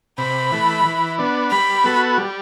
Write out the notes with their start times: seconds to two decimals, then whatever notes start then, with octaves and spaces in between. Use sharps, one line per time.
0.18 C3 B5
0.52 E3 A3
0.85 E3
1.19 B3 D4
1.51 G3 B5
1.84 B3 F#4 A4
2.18 G3